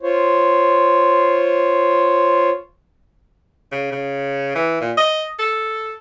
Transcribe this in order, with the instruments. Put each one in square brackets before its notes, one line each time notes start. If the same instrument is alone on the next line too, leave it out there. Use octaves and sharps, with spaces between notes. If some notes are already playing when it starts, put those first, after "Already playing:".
[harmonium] F4 C5 C#5
[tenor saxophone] C#3
C#3
E3
A#2
D#5
A4